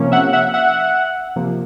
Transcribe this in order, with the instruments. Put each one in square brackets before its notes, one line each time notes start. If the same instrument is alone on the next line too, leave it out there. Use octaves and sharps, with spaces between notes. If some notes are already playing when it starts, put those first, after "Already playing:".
Already playing: [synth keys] C3 F3 A#3 C#4
E5 F#5
E5 F#5
E5 F#5
C3 F3 A#3